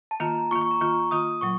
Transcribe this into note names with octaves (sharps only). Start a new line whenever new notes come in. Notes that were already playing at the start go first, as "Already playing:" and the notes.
A5
D#3 A#3 F4 A#5
D#3 A#3 F4 C#6
C#6
A#5
D#3 A#3 F4 C#6
D#3 A#3 F4 D#6
A#2 F#3 C#6